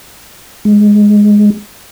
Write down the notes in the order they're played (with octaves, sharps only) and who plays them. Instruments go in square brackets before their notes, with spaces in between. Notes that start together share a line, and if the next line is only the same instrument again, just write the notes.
[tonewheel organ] G#3